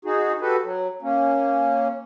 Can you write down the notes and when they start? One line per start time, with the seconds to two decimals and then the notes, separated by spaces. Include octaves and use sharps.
0.05 D#4 F#4 G#4
0.41 F#4 G4 A4 B4
0.64 F#3
1.02 A#3 C#4